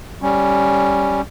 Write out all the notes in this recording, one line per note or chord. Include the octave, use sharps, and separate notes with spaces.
G3 C#4